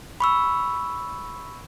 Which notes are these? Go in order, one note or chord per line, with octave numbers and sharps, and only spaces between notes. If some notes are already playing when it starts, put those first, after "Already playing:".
B5 C#6 E6